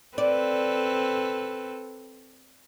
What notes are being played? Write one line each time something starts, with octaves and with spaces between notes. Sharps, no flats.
C4 A4 B4 D5